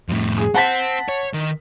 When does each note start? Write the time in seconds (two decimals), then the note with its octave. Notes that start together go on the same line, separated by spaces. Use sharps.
0.09 F2 A2
0.38 G#4
0.55 C4 F#5 A5 B6
1.09 C#5
1.34 D#3